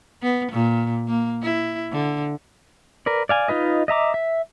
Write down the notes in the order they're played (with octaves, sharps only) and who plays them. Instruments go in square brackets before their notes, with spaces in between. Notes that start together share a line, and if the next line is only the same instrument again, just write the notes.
[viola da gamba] B3
A#2
A#3
E4
D3
[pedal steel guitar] A#4 B4 D5
D5 F5 G#5
D#4 F4 B4 D#5
D#5 E5 A#5 D6
E5